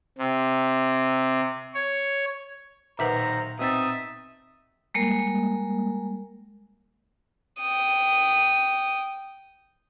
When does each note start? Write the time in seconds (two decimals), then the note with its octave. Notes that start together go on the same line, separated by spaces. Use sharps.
0.18 C3
1.74 C#5
2.99 B1 A#2 D#3 B4 C5 E5 F#5 A#5
3.59 B2 C4 D#4 E5 D#6 A6
4.94 G3 G#3 A#3 A#4
7.60 G5 D#6